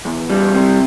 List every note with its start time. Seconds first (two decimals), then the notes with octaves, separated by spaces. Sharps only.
0.05 E2
0.30 G3
0.54 C3